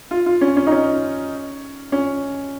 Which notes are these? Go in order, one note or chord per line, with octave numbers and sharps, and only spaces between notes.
F4
F4
C#4
C#4
D#4
C#4
C#4